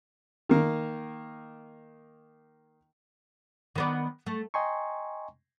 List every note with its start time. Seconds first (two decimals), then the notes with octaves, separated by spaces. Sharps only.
0.49 D#3 A#3
3.76 D#3 B3 D5
4.26 A3
4.54 D#5 G5 G#5 A#5 C6 C#6